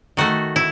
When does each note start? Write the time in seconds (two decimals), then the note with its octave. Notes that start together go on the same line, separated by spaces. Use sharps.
0.17 D#3 A3 F#4
0.56 E4